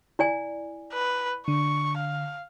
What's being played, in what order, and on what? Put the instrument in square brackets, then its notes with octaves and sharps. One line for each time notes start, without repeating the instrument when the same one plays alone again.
[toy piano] E4 D5 G#5
[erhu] B4
[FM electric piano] D3 [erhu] C#6
[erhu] F5